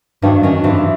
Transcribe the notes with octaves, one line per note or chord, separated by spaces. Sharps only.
G2 D#3 F#3
F#2 D#3 F#3
G2 C3 E3